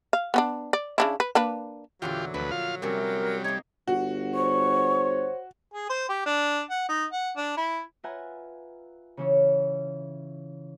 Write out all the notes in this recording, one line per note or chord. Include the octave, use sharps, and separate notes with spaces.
F5
B3 C#4 D4
D5
C#3 D4 E4
B4
A#3 D4 B4
E2 A#2 D3 F#3 F4 G4
D2 F3 B4
F4 F5
C3 G3 A3 C#4 A#4
A#3 D#4 C#5 G#6
G1 F#4
C5 C#5 C#6
G#4
C5
G4
D4
F#5
D#4
F#5
D4
E4
F4 B4 E5 F#5 G#5 A#5
C#3 E3 C#4